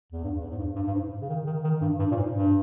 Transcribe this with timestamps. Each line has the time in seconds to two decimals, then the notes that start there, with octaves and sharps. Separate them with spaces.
0.12 E2
0.24 G2
0.41 E2
0.50 G#2
0.58 G2
0.76 G2
0.87 G2
0.94 G#2
1.22 C#3
1.29 D#3
1.47 D#3
1.64 D#3
1.81 G2
1.99 G2
2.11 A#2
2.16 G#2
2.34 G2